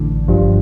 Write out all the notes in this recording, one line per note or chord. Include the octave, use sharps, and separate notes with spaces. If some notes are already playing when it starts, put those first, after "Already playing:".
Already playing: A1 D3
G1 G2 F3